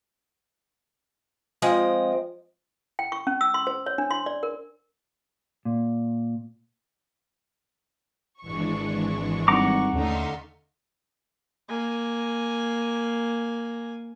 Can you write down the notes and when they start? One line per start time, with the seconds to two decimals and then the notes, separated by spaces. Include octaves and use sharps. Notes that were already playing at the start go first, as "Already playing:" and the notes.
1.62 F3 G#3 C4 D#5
2.99 G5
3.12 C#6
3.27 C#4
3.41 E6
3.54 C6
3.67 C5
3.86 C#5
3.98 D4
4.11 C6
4.26 D5
4.43 A#4
5.65 A#2
8.42 G#1 E3 G#3 D4 C#6
9.48 G3 C4 D#4 F#5 A#5 D6
9.94 D#2 D3 A3 C#4 D#4 E5 F5 C6
11.69 A#3 G#5